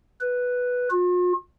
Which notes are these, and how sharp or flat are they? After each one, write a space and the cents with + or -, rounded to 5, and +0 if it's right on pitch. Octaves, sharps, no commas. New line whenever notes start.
B4 +0
F4 +45